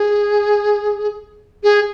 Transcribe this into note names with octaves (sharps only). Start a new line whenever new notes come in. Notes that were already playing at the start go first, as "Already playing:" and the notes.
Already playing: G#4
G#4